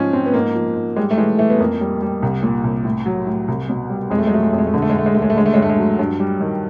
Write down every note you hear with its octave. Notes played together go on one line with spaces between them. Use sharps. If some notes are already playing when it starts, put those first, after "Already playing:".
Already playing: G#2 F3 C#4
F3 C4
B3
G#2 A#3
F3
G#2
G3 G#3
A3
E3 G#3
E3 A3
B3
F2 A#3
G3
G3
C2
A#2
C2
A2
F#3
A2
C2
B2
G3
F2 G#3
A3
G#3
F#3 A3
G#3
F2 A3
G#3
A3
D3 G#3
A3
G#3
D3 A3
G#3
D#2 A3
G#3
A3
D3 G#3
A3
G#3
G2
A3
G#3
F#3
G2
G3
D#3